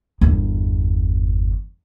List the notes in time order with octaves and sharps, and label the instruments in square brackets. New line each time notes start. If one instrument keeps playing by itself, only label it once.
[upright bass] G1 E2